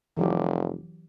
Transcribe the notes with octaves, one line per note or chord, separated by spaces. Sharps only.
F1 E3 F#3 G4